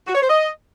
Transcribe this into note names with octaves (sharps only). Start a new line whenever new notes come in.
F#4
C#5
C5
D#5